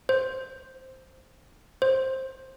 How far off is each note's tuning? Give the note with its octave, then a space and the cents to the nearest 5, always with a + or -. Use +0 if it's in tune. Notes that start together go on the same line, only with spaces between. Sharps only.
C5 +0
C5 +10